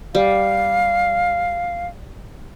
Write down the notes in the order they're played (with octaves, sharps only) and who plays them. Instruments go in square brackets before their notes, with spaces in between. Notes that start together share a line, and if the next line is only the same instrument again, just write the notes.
[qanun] G3 [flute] F5